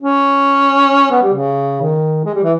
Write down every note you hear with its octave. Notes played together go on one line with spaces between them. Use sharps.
C#4
B3
G3
C#3
D#3
G#3
G3
E3